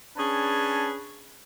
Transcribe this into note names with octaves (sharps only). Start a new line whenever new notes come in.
C#4 D4 G#4 B4 A5